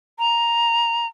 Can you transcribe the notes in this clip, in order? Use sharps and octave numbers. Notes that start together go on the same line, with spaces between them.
A#5